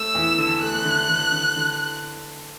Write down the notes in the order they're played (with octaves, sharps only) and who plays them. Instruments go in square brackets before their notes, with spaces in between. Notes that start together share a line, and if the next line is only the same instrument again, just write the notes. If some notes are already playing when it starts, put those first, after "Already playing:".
Already playing: [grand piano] A3 [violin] E6
[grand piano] E2
D3
[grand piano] A3 [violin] F#6
[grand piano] D3
D3
D3
D3